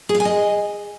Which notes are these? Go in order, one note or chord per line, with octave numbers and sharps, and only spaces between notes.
G#4
F5
G#5
D#5